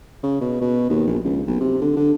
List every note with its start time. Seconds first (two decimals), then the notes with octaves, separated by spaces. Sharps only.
0.23 C#3
0.41 B2
0.61 B2
0.90 D#2
1.07 A#1
1.24 C#2
1.47 B1
1.61 C3
1.81 D3
1.97 D3